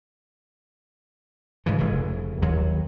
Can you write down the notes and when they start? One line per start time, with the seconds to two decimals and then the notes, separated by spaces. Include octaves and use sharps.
1.66 G#2 C#3 E3
1.78 F1 C#3
2.42 D#2 F#3